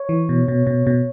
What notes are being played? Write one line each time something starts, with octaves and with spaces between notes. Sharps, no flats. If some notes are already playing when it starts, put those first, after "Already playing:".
Already playing: C#5
E3
B2
B2
B2
B2